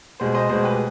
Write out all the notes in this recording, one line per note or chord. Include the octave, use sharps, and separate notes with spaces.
B2 G#3 G#4 C5
C5 D#5
B2 G#3 G#4 C5
G4 B4